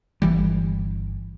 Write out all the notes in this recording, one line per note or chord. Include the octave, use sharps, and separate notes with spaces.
G1 E3 G3